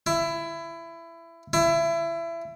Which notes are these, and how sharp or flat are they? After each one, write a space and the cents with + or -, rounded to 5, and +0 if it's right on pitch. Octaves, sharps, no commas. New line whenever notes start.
E4 +20
E4 +25